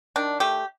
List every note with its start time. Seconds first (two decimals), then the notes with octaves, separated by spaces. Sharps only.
0.16 D#3 D4
0.40 A3 G4